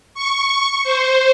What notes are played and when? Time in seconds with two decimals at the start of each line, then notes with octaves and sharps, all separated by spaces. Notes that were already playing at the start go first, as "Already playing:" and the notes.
0.14 C#6
0.84 C5